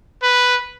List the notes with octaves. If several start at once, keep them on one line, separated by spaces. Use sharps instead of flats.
B4